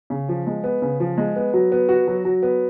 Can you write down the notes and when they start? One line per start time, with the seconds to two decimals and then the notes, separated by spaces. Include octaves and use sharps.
0.10 C#3
0.29 F3
0.47 G#3
0.64 B3
0.82 C#3
1.00 F3
1.18 G#3
1.36 B3
1.53 F#3
1.72 B3
1.89 F#4
2.07 F#3
2.25 F#3
2.43 B3